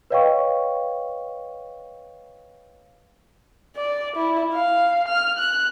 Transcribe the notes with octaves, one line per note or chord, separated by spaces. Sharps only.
B4 C#5 D#5 F5 G5 C#6
D5
E4
F5
F6
F#6